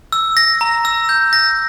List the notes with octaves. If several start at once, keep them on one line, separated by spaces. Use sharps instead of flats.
E6
A#6
A#5
E6
G6
A#6